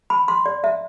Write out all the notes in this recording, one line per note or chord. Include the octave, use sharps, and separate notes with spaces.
B5
C6
D5
E5